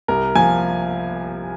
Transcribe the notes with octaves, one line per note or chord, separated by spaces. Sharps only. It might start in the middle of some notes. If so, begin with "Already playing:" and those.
C2 A#4
F3 G#5